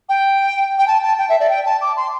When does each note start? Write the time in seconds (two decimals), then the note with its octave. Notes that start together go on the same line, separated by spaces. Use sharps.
0.09 G5
0.79 G5
0.88 A5
1.03 A5
1.19 G5
1.29 E5
1.40 D5
1.50 G5
1.66 A5
1.82 D6
1.97 C6